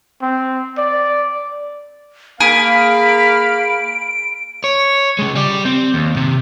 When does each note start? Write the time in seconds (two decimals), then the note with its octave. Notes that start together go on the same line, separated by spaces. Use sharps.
0.22 C4
0.78 D5
2.40 A#3 G#4 F5 B5 D7
4.64 C#5
5.19 C#3 G#3
5.35 G3 D5
5.65 C4
5.94 D#2
6.17 C3